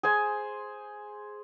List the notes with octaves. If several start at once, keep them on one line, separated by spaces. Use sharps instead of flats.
G#4 C5 G#5